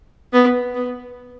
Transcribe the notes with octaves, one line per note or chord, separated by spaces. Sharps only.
B3
B3